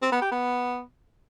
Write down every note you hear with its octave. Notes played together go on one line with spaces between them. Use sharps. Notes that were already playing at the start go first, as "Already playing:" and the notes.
C4
B3
G4
B3